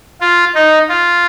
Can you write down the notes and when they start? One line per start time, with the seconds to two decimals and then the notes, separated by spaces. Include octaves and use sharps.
0.21 F4
0.55 D#4
0.89 F4